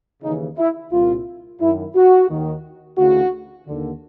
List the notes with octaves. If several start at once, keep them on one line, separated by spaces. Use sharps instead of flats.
D#2 C#3 E3 D#4
E4
C2 A#2 F4
F#2 D#3 E4
F#4
D#2 D#3
D2 C#3 E3 F#4
D#2 D3